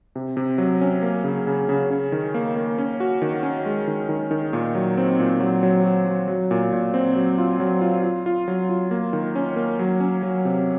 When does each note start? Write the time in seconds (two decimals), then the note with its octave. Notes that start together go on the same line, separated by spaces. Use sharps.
0.16 C3
0.37 C3
0.58 F#3
0.81 C#4
1.02 A#3
1.24 C#3
1.47 C#3
1.69 C#3
1.90 C#4
2.12 D#3
2.34 A#3
2.56 A#3
2.78 C#4
3.00 F#4
3.22 D#3
3.43 C#4
3.66 G#3
3.88 D#3
4.09 D#3
4.31 D#3
4.53 A#2
4.75 F#3
4.97 C4
5.19 A#2
5.40 F#3
5.63 F#3
5.84 F#4
6.07 F#3
6.28 F#3
6.51 A#2
6.73 A#2
6.94 C4
7.16 F#3
7.38 F4
7.60 F#3
7.81 F4
8.03 F4
8.26 F4
8.48 F#3
8.69 F4
8.91 A#3
9.13 D#3
9.36 C#4
9.56 A#3
9.79 F#3
10.00 C#4
10.23 F#3
10.45 C3